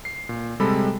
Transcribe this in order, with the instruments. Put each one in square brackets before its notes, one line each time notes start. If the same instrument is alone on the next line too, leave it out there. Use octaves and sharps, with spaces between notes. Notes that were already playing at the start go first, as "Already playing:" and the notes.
[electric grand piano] C7
A#2
C3 G3 G#3 A4 B5